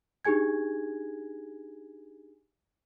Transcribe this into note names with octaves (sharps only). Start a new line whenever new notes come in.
D4 D#4 G4 G#4 G#5 G#6